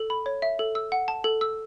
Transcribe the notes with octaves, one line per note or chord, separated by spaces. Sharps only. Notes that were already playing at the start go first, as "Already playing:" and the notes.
Already playing: A4
B5
C#5
E5
A4
E6
F#5
A5
A4
E6